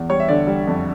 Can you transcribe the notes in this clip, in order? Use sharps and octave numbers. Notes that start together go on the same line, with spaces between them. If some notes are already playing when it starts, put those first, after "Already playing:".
Already playing: E2
G3 C#5
E5
D3 D5
G3
F2